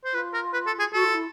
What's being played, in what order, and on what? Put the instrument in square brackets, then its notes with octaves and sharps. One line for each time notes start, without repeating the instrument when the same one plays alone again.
[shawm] C5
[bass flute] F4 [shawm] B4
[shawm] A#4
B4
A4
G#4
[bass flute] F#4 [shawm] A4
[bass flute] F4
E4